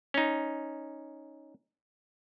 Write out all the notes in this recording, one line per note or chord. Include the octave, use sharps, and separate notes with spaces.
C#4 D#4